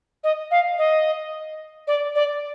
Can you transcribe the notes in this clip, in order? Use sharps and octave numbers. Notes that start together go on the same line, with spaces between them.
D#5
F5
D#5
D5
D5